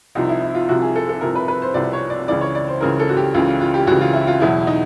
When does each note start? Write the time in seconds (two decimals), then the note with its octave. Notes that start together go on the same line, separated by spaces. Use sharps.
0.15 C2 C3 F3 D#4
0.29 E4
0.42 E4
0.54 F4
0.69 C2 C3 F3 F#4
0.82 G#4
0.96 A4
1.09 A4
1.21 C2 C3 F3 A#4
1.35 B4
1.48 B4
1.62 C5
1.74 C2 C3 F3 D5
1.93 C#5
2.10 D5
2.28 C#2 C#3 E3 D5
2.41 C#5
2.55 D5
2.68 C5
2.81 C#2 C#3 E3 A#4
2.99 A4
3.09 F#4
3.17 G4
3.34 C#2 C#3 E3 F4
3.48 F4
3.61 F4
3.74 G4
3.87 C#2 C#3 E3 F#4
4.01 F4
4.14 E4
4.27 F4
4.40 E2 B2 F#3 E4
4.67 D#4